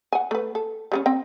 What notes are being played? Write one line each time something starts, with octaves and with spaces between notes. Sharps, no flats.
F#5 G#5
A3 B4
A4
G3 B3 C#4
C4 G5